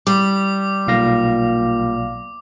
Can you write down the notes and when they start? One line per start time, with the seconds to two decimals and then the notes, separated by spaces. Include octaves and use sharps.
0.07 G3 D6
0.87 B1 A#2 F5 A#6